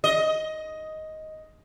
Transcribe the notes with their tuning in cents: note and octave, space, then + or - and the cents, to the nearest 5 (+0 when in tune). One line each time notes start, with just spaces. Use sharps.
D#5 +10